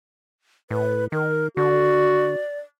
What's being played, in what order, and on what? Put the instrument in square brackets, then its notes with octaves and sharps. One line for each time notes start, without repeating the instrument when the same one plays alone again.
[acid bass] A2 [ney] B4
[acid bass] D#3 [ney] A#4
[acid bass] D3 [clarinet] F#4 [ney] D5